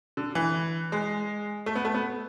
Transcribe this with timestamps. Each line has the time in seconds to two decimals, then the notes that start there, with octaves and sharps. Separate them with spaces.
0.17 D3
0.35 E3
0.92 G#3
1.66 A3
1.75 B3
1.85 A3
1.95 B3